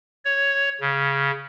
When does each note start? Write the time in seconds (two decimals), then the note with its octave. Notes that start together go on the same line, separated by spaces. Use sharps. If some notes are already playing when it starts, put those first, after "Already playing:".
0.25 C#5
0.81 C#3